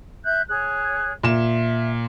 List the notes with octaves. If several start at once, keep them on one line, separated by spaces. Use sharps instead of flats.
E5 F#6 G6
G#4 C#5 F#6
A#2 E5 E7